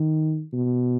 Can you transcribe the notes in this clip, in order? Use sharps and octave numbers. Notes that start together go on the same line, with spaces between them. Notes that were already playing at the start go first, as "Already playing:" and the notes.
Already playing: D#3
B2